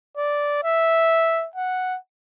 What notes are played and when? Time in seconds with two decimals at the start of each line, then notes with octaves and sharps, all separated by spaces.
0.17 D5
0.64 E5
1.56 F#5